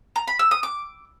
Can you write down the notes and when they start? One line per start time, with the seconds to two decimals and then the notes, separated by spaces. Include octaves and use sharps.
0.16 A#5
0.27 B5
0.39 E6
0.51 D#6
0.63 D6